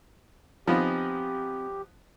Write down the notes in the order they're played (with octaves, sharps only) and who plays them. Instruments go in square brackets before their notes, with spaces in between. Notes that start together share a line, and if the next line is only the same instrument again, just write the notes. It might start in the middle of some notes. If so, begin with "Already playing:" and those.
[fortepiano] F3 B3 D#4 [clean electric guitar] C4 G#5 [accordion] G4